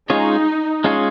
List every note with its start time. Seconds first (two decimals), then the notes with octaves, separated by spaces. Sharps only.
0.10 G#3 C#4 D#4 F4 G#4 C#5
0.84 G#3 C#4 F4 G#4 C#5